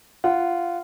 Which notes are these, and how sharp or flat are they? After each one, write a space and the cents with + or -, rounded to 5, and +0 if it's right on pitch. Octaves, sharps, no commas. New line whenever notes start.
F4 -15 F#5 +0